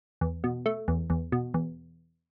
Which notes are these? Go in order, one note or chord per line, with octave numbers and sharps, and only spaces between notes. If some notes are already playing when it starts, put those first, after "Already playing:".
E2
B2
A3
E2
E2
B2
E2